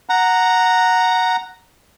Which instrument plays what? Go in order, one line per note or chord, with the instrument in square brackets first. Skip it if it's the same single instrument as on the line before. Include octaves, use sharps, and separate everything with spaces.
[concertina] F#5 A#5